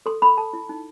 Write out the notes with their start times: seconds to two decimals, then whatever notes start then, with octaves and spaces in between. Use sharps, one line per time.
0.06 A4 C6
0.22 A4 B5
0.37 A4 A5
0.53 E4
0.69 D#4